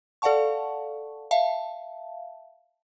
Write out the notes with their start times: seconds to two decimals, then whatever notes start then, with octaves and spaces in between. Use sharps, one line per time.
0.22 A4 D5 F5 F#5 A5 C#6
1.31 E5 F5 A5